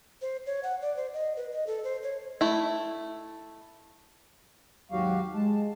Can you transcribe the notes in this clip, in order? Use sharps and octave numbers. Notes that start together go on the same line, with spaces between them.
C5
C#5
F#5
D5
C5
D#5
B4
D#5
A4
C5
C#5
A3 E4
D#2 G#2 F#3 F#4 G4 F5
G#3 A5